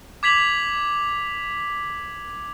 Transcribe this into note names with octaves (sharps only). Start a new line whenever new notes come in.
D6 G#6 B6 F7 F#7